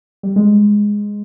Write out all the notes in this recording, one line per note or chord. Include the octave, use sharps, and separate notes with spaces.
G3
G#3